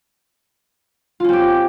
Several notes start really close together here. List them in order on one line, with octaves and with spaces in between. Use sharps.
F4 C#4 C4 G4